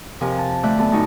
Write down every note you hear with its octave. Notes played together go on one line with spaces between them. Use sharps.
F2 C3 F3 A#4 G#5
A5
D2 A3 D5 E5 F#6 G6
F#2 B3 A4 A5
D2 A2 C#4 D#4 F#4